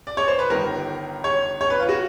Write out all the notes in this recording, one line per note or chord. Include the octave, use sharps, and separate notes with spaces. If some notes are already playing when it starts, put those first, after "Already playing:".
D5
C#5
C5
B4
G1 G2 D#3 A#4
C#5
C#5
B4
F4
F#4